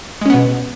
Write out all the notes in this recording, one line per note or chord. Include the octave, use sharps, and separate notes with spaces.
B2 G#3 B3 C#4